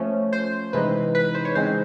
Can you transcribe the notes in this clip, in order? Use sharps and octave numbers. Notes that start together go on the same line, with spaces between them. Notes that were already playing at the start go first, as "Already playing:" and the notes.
Already playing: F3 A3 C#4
C5
C3 E3 G#3 C4 D#4 B4
B4
B4
C5
C#5
C#3 E3 G#3 C4 D#4 C5